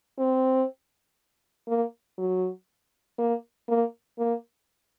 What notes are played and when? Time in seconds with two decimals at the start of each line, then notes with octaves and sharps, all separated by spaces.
0.18 C4
1.68 A#3
2.18 F#3
3.19 A#3
3.68 A#3
4.19 A#3